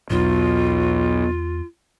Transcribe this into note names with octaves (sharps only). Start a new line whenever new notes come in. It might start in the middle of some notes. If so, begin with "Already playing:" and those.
B1 E2 F4